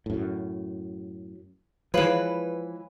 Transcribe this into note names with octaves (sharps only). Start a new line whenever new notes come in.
F#2 A2
E3 F3 G#3 B4 C#5 F5 F#7